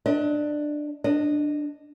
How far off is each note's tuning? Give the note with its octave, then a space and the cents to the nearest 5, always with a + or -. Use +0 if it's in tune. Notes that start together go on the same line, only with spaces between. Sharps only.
D4 +15 D#5 +35
D4 +10 D#5 -10